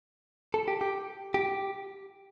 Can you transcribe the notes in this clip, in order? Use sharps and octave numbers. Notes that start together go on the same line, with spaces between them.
A4
G4
G4
G4